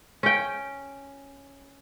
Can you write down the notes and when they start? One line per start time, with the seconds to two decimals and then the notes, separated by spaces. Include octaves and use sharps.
0.23 C#4 G5